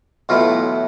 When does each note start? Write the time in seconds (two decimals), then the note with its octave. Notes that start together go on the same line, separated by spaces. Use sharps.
0.29 B1 A2 E3 F4